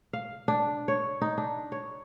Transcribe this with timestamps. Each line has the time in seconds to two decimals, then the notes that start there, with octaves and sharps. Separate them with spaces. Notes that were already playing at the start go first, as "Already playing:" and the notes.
0.13 F5
0.48 D4
0.88 C#5
1.22 D#4
1.38 D4
1.72 C#5